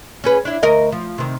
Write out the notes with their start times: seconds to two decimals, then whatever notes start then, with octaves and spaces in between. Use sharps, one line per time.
0.24 C#4 G#4 B4
0.45 D4 E4
0.63 D2 A#4 D#5
0.92 F3
1.18 C3 D#3